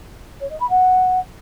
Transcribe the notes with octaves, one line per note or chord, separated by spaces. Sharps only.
C#5
D#5
B5
F#5